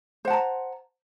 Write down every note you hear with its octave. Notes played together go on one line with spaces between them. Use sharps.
C5 F#5 A5 A#5